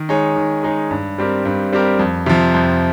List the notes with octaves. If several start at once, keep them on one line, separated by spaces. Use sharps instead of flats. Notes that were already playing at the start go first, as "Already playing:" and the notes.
Already playing: D#3
G#3 D#4 G#4 C#5
D#3
G#3 D#4 G#4 C#5
G2
G3 C4 G4 A#4
G2
G3 C4 G4 A#4
F2
C3 F3
F2